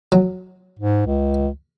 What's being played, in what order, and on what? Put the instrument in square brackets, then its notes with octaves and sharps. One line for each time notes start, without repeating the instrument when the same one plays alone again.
[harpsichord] F#3
[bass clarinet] G#2
C#2